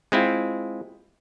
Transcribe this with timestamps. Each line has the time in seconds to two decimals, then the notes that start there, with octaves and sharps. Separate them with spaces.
0.12 G#3 C4 E4 F4